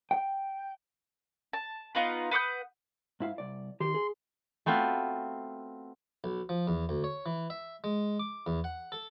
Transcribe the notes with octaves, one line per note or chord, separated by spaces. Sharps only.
G5
A5
B3 D#4 F4 B4
B4 F#5 D#6 G6
G#2 E4 F5
C2 D5
D#3 G4 C6
G#4
A3 B3 C4 F4 F#4
B1
F3
E2
D2
C#5
E3
E5
G#3
D6
E2
F#5
A4